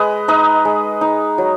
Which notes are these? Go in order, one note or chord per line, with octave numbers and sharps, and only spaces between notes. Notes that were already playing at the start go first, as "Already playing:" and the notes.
Already playing: G#3 B4 D#5
D#4 B4 D#5
G#3
D#4
F#3